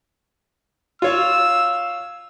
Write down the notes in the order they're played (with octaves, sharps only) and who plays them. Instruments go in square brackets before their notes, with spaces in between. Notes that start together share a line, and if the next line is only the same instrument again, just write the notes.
[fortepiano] F4 C#5 F5 [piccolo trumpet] E6